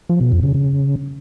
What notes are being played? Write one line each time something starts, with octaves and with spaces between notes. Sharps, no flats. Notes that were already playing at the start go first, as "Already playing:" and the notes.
F3
B2
F2
C#3
C#3